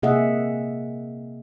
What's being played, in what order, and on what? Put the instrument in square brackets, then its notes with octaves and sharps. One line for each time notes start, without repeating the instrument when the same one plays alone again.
[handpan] C3 A#3 G#4 D#5 E5 F#5